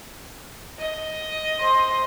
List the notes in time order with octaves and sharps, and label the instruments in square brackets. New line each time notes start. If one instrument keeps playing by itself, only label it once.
[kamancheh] D#5
[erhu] C5